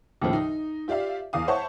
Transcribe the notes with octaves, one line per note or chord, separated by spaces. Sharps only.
D#2 A2 C#3 F3
D#4
F4 G4 D5 E5 F5
E2 F5 D#6
C5 C#5 E5 F#5 A5 C#6